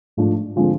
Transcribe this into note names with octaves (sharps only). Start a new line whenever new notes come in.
G#2 F3 A3 D4
D3 F3 G#3 C4